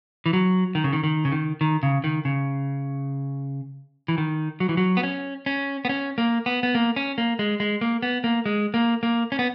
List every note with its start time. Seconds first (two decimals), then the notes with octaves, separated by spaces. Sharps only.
0.26 E3
0.33 F#3
0.75 D#3
0.84 C#3
0.93 D#3
1.04 D#3
1.25 C#3
1.32 D#3
1.61 D#3
1.83 C#3
2.04 D#3
2.25 C#3
4.08 E3
4.18 D#3
4.60 F#3
4.69 E3
4.77 F#3
4.97 B3
5.03 C#4
5.46 C#4
5.85 B3
5.89 C#4
6.18 A#3
6.46 B3
6.63 B3
6.75 A#3
6.96 C#4
7.18 A#3
7.39 G#3
7.60 G#3
7.81 A#3
8.03 B3
8.24 A#3
8.46 G#3
8.74 A#3
9.03 A#3
9.32 C#4
9.39 B3